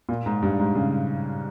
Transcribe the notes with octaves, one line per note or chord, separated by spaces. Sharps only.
A#2
G#2
G2
G#2
C#3